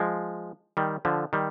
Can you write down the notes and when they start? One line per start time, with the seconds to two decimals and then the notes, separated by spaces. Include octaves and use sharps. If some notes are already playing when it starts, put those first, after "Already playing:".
Already playing: F3 G#3
0.77 D#3 G3
1.05 D3 F3
1.33 D#3 G3